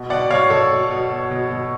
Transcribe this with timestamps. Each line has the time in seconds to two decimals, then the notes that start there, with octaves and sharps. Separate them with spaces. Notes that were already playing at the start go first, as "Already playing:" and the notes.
Already playing: B2
0.10 B2 D5 F#5
0.30 B2 C#5 F5
0.50 B2 A4 C#5
0.71 B2
0.91 B2
1.10 B2
1.31 B2
1.50 B2